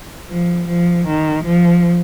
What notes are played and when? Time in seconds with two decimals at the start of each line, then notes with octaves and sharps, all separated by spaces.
0.31 F3
0.69 F3
1.07 D#3
1.46 F3